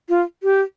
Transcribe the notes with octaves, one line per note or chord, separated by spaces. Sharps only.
F4
G4